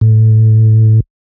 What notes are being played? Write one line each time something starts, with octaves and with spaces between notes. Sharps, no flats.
A2